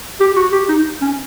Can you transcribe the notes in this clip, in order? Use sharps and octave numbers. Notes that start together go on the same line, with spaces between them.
G4
F#4
G4
D#4
C#4